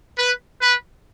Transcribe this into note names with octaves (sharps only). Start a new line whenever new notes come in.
B4
B4